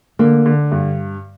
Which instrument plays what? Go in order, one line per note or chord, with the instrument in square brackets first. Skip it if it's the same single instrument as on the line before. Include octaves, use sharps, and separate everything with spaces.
[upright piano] D3 [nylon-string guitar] A#3
[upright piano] D3
G2